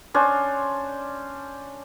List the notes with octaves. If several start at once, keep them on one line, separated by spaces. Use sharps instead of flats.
C#4 D4 C5